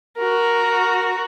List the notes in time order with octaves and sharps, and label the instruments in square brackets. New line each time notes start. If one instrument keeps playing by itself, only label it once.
[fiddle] F#4 A#4